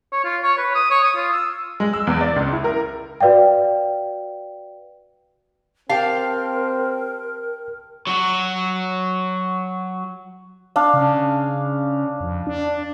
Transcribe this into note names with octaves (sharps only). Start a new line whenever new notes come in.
C#5
F4
C#5
B4
D#6
C#5
D#6
F4
E6
G#3
E6
E2
D5
C#2
E4
A#4
F#4 B4 D5 F5 G5
C4 G4 A#4 F5 G5 A5
F#3 F#4
D4 F5
C#3
F2
D4